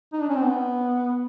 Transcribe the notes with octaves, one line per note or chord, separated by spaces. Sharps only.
D#4
D4
C#4
C4
B3